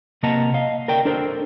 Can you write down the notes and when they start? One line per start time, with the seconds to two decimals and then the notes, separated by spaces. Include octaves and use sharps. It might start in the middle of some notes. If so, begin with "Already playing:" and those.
0.23 C3 A#3 D#5 F#5 A5 A#5
0.54 D#5 F5
0.88 A#4 D5 G5
1.05 D4 A4 A#4 C5